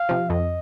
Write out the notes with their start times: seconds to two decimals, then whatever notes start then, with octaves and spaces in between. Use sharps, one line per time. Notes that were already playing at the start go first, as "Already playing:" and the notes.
Already playing: F5
0.09 C3 F3
0.30 F2 D#5